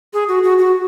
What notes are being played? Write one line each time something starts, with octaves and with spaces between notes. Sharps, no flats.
G#4
F#4
F#4
F#4